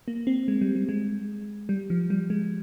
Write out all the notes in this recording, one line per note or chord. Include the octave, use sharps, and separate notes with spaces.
A#3
C4
G#3
G3
G3
G#3
G3
F3
G3
G#3